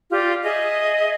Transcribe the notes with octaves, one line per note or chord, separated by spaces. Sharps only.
F4 G4 D5
G#4 D#5 E5